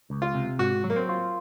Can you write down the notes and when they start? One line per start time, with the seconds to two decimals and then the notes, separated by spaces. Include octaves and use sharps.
0.10 C#2
0.22 F4
0.34 C3
0.59 G#2 F#4
0.84 F#3
0.90 A#3
0.96 C4
1.09 F4